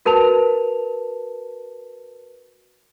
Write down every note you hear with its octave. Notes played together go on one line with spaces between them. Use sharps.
F#4 A#4 B4 A5 F7